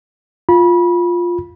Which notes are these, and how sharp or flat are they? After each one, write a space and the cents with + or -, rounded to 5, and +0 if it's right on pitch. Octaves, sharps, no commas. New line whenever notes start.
F4 +5 B5 -25